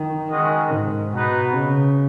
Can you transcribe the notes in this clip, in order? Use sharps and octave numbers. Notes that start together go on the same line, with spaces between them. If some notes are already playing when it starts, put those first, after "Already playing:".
Already playing: D#3
D#3 G#3 C#4 F#4 D#5
G#2
B2 B3 D#4 B4
C#3